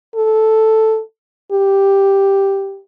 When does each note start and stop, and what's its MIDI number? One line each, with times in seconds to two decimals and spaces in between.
0.16 1.01 69
1.53 2.80 67